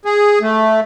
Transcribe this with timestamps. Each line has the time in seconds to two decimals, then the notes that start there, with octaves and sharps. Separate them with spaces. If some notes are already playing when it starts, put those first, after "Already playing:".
0.05 G#4
0.41 A3